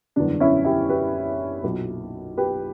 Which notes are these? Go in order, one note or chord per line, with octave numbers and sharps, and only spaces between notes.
F#1 E2 D3 G3 D4
C#4 E4
E4 G4
G4 B4
B1 A#2 F#3
G4 B4